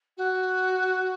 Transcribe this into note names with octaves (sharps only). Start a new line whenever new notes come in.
F#4